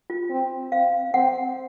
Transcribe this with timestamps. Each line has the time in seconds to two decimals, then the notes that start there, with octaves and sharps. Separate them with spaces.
0.10 F4
0.30 C4
0.72 C4 F5
1.14 C4 F#5